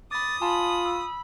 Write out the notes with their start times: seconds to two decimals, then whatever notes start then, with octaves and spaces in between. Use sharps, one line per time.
0.11 B5 D6 D#6 A6
0.42 F4 G#5 A5 B5 C6
0.86 E6